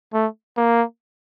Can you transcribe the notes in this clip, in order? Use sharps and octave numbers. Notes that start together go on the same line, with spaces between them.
A3
A#3